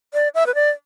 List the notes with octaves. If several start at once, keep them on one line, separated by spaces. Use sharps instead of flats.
D5
E5
B4
D5